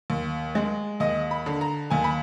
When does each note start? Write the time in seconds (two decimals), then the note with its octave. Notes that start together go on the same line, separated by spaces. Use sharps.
0.10 D#2
0.55 G#3
1.00 D#2 D#5
1.31 B5
1.46 D3
1.61 A#5
1.90 D#2 G#5
2.04 B5